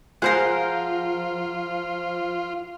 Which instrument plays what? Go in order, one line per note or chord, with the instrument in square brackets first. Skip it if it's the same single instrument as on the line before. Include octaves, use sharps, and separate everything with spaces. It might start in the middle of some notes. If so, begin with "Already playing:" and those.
[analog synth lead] F3 [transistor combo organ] F4 [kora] G#4 C5 [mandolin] A#4 F5 F#5